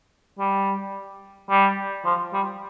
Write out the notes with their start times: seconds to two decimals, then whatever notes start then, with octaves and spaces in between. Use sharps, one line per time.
0.39 G3
1.50 G3
2.05 F3
2.33 G3